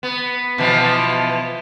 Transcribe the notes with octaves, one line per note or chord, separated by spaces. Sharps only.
B3
B2 E3 F3